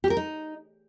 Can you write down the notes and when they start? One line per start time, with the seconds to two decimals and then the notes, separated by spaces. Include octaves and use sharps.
0.04 G4
0.10 A#4
0.17 D#4